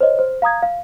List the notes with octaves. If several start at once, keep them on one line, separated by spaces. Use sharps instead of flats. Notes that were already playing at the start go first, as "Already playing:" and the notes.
C5 C#5 D#5
C5
F5 A#5 D#6 G#6
F5